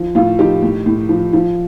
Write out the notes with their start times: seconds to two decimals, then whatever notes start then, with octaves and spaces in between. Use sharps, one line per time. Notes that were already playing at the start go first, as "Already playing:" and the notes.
Already playing: F3
0.15 A2 F4
0.39 F3 D#4 G4
0.62 A2
0.86 A2
1.09 F3
1.33 F3